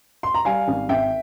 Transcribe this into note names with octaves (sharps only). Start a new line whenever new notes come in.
C6
A#5
G3 F5 G#5
G#1
G#1 E5 G5